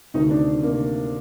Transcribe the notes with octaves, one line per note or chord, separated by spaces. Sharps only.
D2 C3 D#3 D#4
D4
C3 D#3 A#3